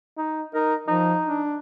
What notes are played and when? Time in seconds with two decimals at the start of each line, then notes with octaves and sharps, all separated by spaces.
0.17 D#4
0.54 D#4 A#4
0.88 F3 D#4
1.26 D4